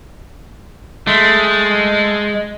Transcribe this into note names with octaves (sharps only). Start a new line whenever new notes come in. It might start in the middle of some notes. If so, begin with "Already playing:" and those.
G#3 A3